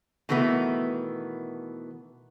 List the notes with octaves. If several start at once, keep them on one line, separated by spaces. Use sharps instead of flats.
B2 D#3 E3 A3 B3